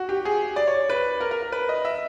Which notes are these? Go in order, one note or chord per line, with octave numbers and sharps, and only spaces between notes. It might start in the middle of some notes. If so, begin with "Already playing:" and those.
Already playing: F#4
G4
G#4
D5
C#5
B4
A#4
A#4
A#4
B4
D#5
E5